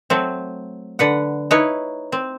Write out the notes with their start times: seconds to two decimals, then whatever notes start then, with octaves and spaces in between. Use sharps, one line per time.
0.10 F#3 A3 C4
0.99 D3 B4 F#5
1.51 D#4 E4 B4 C#5
2.12 C4